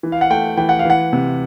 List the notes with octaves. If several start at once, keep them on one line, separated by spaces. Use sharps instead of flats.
E3
F5
F#5
A3 G5
E3 G5
F#5
F5
E3 F#5
C3